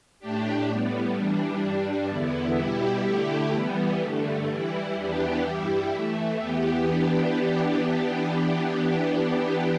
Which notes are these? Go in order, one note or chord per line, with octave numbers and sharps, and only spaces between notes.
A2 A3 D4 G4
A2 G3 B3
E3 G3 D4
G2 G3 D4
E2 D3 B3 E4
B2 G3 E4 G4
D3 A3 E4 G4
E3 G3 B3
G2 D3 A3
E3 G3 E4
E2 E3 B3 D4 G4
G2 G3 E4 G4
E3 A3 E4
E2 E3 B3 G4
E3 B3 D4 G4